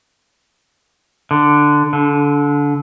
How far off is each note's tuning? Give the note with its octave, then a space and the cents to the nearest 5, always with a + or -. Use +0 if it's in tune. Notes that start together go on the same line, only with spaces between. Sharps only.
D3 +5
D3 -25